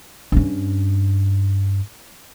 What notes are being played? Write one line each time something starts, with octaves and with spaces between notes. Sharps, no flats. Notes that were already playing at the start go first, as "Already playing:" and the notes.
G2 C#4